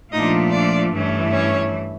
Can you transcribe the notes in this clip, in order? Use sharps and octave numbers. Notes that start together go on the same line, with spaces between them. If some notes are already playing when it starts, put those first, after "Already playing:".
A#2 F3 A3 D4 D#4 F4 D#5
D4 D5
G2 E3 A3 C#4 E4
C#4 C#5